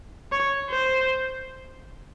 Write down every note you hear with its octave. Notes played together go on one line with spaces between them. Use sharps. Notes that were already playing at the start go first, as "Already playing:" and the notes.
C#5
C5